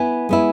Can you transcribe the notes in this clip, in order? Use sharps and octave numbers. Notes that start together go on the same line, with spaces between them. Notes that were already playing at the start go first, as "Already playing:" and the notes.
Already playing: B3 E4 G#5
G#3 B3 E4